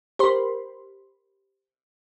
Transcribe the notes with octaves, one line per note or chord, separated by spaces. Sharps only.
G4 A#4 C5 B5 C6